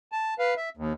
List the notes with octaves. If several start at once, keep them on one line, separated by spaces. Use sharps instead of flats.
A5
B4 F5
E5
D#2